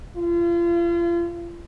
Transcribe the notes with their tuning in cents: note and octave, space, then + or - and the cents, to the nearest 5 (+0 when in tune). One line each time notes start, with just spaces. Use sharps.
F4 -35